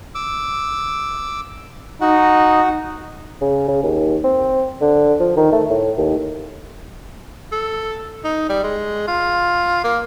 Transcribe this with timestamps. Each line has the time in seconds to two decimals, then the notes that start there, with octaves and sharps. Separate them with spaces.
0.15 D6 E6
2.01 D#4 F#4 F#5
3.41 C#3
3.68 C#3
3.83 D#2
4.24 C4
4.81 D3
5.19 F3
5.37 D#3
5.52 A3
5.70 A2
5.97 D#2
7.52 A4
8.24 D#4
8.49 G3
8.64 G#3
9.08 F4
9.84 A#3